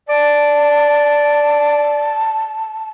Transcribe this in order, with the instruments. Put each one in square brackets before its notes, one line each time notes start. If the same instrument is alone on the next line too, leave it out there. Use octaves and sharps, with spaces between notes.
[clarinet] D5 [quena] A5